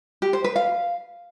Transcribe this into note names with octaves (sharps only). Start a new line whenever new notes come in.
G4
C5
B4
F5